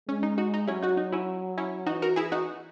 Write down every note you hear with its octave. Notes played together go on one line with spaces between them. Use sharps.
G#3 C#4
D#4
D#4 F#4
D#4
F#3 C#4 E4
D#4 F#4
D#4
C#4 E4
C#4 E4
E3 D#4 F#4
F#4 A#4
E4 G#4
D#4 F#4